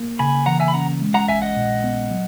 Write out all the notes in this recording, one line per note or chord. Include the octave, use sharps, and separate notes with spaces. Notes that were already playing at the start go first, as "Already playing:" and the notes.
Already playing: A#3
C#3 G#5 B5
E3 F#5 A#5
E5 G#5
B5
C#4 F#5 A#5
G#3
F#5 A#5
A#1 E5 G#5
D#5 F#5
A#2
B3
F#3